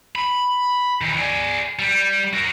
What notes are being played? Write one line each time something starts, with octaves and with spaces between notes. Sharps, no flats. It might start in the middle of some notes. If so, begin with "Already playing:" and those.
B5
D#3 E3
G#4 D5
G3
F#4 A#4